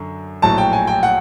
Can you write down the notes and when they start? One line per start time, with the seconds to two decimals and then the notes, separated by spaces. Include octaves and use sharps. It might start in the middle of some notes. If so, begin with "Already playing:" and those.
Already playing: F#2 D3
0.42 A#1 A2 F#3 A5
0.58 G5
0.73 G#5
0.87 G5
1.03 F#5